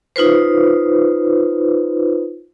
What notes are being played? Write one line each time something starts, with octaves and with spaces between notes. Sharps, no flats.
D#4 F4 B4 C5